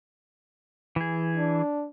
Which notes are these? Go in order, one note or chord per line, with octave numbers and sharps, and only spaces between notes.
E3 G#4
D4